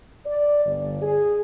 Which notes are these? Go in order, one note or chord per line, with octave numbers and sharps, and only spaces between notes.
D5
G1
G#4